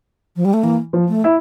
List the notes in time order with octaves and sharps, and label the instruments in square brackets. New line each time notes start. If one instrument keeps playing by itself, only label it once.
[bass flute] F3
G3
A3
[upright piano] E3 [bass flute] A#3
[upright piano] F3
[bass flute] A3
[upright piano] E4